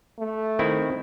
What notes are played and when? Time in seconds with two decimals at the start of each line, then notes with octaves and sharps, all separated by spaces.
0.19 A3
0.59 D#3 C4 E4